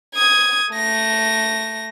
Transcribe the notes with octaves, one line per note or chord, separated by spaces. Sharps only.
D#6 G#6
A3 A#6